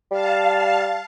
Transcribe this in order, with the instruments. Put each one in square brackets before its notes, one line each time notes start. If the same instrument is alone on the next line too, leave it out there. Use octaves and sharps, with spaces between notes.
[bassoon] G3 [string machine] F5 A5